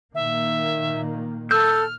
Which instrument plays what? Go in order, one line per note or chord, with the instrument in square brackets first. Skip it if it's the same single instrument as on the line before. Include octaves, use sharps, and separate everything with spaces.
[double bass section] A#2 D#3 A#3 [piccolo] E5
[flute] A4 [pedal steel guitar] E6 G6 [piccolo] F6